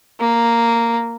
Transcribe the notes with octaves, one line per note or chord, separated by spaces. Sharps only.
A#3